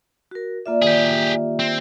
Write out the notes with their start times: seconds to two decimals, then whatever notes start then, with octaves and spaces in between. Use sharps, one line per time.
0.31 F#4 A#4
0.66 A#3 F4 A#4 D5 E5
0.82 D#3 G4 G#4 E7
1.06 G3
1.60 C4